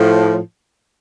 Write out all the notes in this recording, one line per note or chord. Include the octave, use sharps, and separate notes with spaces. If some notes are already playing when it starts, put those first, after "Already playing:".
Already playing: A2 F3